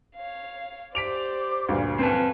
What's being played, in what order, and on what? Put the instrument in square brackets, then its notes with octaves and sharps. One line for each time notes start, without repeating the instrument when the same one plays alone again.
[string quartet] C#5 F5
[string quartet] G4 C5 D5 [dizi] D6 [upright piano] B6 D7 F7
[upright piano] D2 G2 A#2 [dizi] F5
[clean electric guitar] C4 A5 [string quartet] B4 G#5